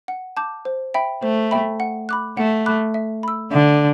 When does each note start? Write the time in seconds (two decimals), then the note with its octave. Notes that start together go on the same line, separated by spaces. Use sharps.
0.08 F#5
0.37 A5 D6 G6
0.65 C5
0.94 E5 G5 B5
1.23 A3 C5
1.51 E5 G5 B5
1.80 F#5
2.09 B5 D6 F#6
2.37 A3 F#5
2.66 B5 D6 F#6
2.94 E5
3.23 B5 E6
3.52 D3 E5